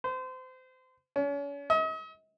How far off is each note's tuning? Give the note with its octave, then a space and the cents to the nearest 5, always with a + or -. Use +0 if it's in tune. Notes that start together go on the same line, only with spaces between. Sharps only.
C5 -30
C#4 +40
D#5 +40